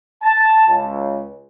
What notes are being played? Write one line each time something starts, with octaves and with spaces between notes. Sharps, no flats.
A5
C#2